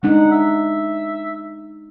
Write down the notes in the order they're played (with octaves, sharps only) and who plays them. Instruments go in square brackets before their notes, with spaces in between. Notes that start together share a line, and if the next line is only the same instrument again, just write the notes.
[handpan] G#3 D4 D#4 [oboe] F#5
[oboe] E5